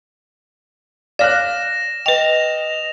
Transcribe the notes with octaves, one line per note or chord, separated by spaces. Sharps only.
C#5 D5 F5 F6 F#6 A#6 E7
B4 D#5 G5 F7